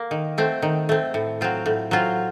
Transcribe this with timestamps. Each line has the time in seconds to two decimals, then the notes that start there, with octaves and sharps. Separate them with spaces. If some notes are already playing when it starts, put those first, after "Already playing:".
Already playing: A#3
0.11 D#3
0.38 A3 C4
0.62 D#3
0.89 A3 C4
1.14 A2
1.41 F#3 C4 F4
1.66 A2
1.91 F#3 C4 F4